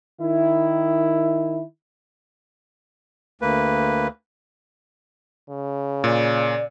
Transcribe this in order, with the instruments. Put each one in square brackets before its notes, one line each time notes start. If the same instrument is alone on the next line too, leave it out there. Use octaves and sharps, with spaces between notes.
[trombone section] D#3 E4
[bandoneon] D2 A#3 B4
[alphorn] C#3
[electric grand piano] A#2 [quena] D5